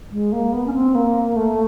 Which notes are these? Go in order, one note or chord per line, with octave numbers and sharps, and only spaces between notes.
G#3
A#3
B3
C#4
C4
A#3
A3